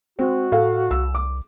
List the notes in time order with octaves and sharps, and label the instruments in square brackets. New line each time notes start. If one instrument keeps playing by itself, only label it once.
[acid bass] G#3 [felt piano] C4 [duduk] F#4
[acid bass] A2 [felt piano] A4 F5
[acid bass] C2 [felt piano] E6
[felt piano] D6